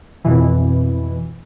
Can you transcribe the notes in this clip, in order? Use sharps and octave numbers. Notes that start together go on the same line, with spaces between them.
F2 B2 E3